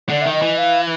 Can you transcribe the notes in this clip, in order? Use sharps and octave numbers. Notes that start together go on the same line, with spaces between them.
D3 D5
D#3 E5
D#5
E3
F5